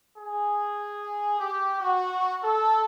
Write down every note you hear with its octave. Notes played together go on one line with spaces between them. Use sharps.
G#4
G4
F#4
A4